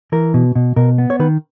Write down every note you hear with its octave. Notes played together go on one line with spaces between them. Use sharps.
E3 A#4
B2
B2
B2 A#4
B3
C#5
D#3 B4